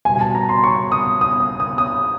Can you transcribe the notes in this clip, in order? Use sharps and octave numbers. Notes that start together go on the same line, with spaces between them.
B2 G3 G#5
G#5
A5
A#5
C6
C#6
D#6
D#6
D#6
D#6
D#6